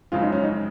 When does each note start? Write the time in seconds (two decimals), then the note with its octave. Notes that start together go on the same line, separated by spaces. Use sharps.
0.12 F#2 C#3 F3 G#3 C4 F4
0.22 D#4
0.32 C#4
0.44 D#4